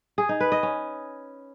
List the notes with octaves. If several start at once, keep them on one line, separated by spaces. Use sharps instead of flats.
G#4
D#4
B4
D#5
C#4